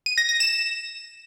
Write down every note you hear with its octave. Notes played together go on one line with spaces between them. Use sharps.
D#7
A#6
A#6
E7